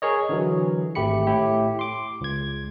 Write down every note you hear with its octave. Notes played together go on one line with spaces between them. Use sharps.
G#4 A#4 C#5 D#5
D3 E3 F#3
G#1 A3 G4 B5 C#7
A2 E4 G4
C6 D6
C#2 G#6